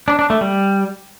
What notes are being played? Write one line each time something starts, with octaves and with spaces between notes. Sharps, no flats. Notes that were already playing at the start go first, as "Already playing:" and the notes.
D4
D4
A3
G3